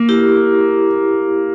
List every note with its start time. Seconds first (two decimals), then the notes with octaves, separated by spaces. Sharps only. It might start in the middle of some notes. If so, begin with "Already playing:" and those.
Already playing: A#3
0.09 E4 G4